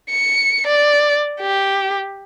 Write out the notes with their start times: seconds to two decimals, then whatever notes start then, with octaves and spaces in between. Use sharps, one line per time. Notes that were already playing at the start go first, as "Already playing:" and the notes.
0.10 C#7
0.67 D5
1.41 G4